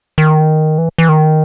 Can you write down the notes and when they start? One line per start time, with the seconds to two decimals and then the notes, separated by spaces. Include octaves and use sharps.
0.18 D#3
0.78 E3
0.98 E3
1.09 D#3